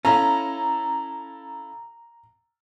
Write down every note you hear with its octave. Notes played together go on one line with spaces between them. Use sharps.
C#4 E4 A4 F5 A#5